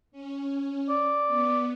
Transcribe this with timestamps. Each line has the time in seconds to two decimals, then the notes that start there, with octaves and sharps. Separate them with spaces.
0.12 C#4
0.89 D5
1.27 B3